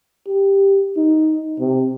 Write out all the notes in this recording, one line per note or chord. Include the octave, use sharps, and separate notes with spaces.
G4
D#4
C3